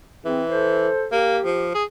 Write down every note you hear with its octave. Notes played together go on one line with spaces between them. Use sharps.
E3 C4 G#4
A4 C5
A#3 G4
F3
G#4